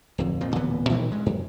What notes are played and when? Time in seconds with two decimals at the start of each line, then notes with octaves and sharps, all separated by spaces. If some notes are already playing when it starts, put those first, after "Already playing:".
0.18 D1 F2
0.41 F2 A#2 F3
0.55 D1 A#2 E3 B3
0.90 A#2 D#3 E3 A3
1.10 G2 G#3
1.26 F#2